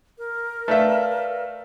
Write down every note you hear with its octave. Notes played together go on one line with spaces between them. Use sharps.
A#4
A3 B4 D5 E5 F5